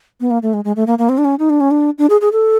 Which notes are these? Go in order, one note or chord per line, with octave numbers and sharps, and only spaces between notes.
B3
A#3
A3
G#3
G#3
A3
A#3
A#3
C4
D4
C#4
D#4
D4
C#4
D4
D4
G#4
G#4
A4